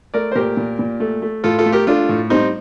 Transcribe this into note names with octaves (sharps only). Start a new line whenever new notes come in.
A3 A#4 D5
C5
A#2 G4 A#4
A#2
A#2
A3
A3
A2 F4 A4
F4 A4
A3
G4 A#4
A3 D4 F4
A2
G3 C4 D#4